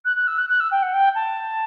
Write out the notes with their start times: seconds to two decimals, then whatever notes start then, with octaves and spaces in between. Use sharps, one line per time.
0.05 F#6
0.16 F#6
0.27 E6
0.38 F#6
0.49 F#6
0.60 E6
0.71 G5
0.82 F#5
0.93 G5
1.15 A5